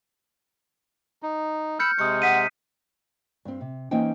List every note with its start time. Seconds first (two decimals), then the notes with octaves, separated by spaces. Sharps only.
1.23 D#4
1.79 B5 E6 F6 G6 C#7
1.99 C3 G#3 C#6 D#6 C#7
2.22 F#5 D#6 B6 D#7
3.45 G2 G3 C4
3.61 C3
3.91 E3 A#3 C#4 D#4 C5 G5